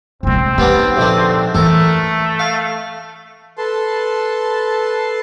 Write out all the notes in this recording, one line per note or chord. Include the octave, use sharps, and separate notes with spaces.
C3 G#3 C4
G3 B3 D4 D#4
A#1 D3 D4
E3 A3 A4 A#4
F5
A4 B4 A5 C6